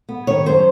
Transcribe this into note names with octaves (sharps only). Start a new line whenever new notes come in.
B3
D#3 C#5
F#2 C5